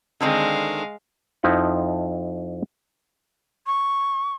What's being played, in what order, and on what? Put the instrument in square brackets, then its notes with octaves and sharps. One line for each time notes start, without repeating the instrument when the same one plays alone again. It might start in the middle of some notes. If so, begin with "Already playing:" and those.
[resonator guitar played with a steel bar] D3 D#3 C4 [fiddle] G#3 F5
[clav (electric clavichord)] F2 F3 D#4 E4 D#5 F#5
[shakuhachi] C#6